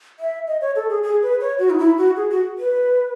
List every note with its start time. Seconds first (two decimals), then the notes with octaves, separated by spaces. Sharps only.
0.20 E5
0.47 D#5
0.61 C#5
0.76 A4
0.89 G#4
1.03 G#4
1.22 B4
1.40 C#5
1.59 F#4
1.70 D#4
1.78 E4
1.98 F#4
2.16 G#4
2.30 F#4
2.58 B4